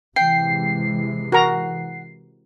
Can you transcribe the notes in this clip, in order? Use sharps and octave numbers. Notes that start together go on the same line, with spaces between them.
C3 E3 G#3 G5 C7
F#4 A#4 F#5 A#5